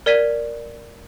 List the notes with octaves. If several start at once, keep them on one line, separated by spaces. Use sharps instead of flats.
A#4 D5 G#6 B6 D#7